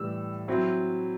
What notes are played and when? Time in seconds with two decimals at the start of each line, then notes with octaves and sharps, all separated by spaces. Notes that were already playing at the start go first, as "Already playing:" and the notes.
Already playing: A2 E3 G3 E6
0.48 F#3 C4 E4